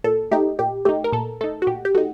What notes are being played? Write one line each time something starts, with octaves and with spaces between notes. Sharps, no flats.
A#2 A4
A3 D#4 G4
A#2 G4
A3 D#4 G4
A#4
A#2 A4
A3 D#4 A4
F#4
A#2 G4
G4
A3 D#4 F#4